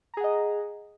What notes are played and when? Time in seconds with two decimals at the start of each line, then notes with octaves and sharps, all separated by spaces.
0.14 A#5
0.17 G#4
0.21 F#5
0.24 D#5